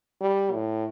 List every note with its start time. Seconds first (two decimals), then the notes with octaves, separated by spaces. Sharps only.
0.21 G3
0.52 A2